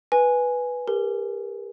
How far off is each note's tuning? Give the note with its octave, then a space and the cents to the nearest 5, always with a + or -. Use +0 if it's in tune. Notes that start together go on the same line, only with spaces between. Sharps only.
B4 -5 G#5 +0
G4 +35 A#4 +0